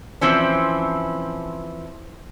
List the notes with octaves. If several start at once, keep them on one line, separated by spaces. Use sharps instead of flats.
E3 F3 C4 C#4